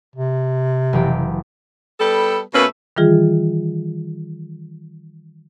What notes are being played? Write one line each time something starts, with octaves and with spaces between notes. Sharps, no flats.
C3
F#1 E3 G4
G3 B3 A4
B2 A3 A#3 C#4 B4
D#3 E3 G3 F4 G#4